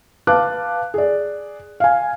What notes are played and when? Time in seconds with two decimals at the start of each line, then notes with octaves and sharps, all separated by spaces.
0.27 B4 F5 A5 D6 F#6
0.94 G#4 D5
1.80 F5 G#5